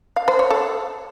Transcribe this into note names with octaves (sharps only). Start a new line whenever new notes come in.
F5
C5
C#5
A4